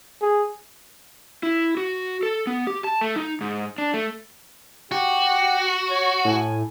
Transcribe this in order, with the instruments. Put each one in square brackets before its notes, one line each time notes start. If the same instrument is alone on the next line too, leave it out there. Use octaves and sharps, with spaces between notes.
[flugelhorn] G#4
[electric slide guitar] E4
F#4
A4
B3
G4
A5
A3
D#4
G#2
D4
A3
[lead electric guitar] F#4 [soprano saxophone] G4
[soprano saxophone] C#5
[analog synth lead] A2 [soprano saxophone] G#5